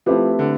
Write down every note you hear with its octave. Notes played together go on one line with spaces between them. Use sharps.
F3 A3 C4 E4 G4 B4
D3